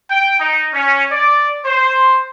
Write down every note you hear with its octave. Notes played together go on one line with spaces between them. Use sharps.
G5
D#4
C#4
D5
C5